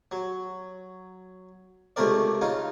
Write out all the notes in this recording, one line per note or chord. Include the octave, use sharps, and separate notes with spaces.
F#3
C#2 C3 A3 C4 A#4 D5
C#3 D#4 F4